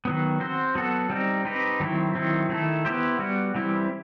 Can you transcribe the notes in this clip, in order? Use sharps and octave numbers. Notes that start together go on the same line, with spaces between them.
D#3 F#3 B3
C4 F#4 C5
F#3 B3 F#4 A4
G3 C4 D#4
C4 D#4 G4 B4
D#3 F#3 C4 E4
D#3 F#3 C4 E4
D#3 A3 E4 A4
B3 E4 G4 C5
G3 B3 F#4
E3 G3 C4 E4